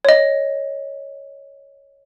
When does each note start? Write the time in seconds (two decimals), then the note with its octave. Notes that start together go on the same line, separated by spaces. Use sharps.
0.05 C#5 D#5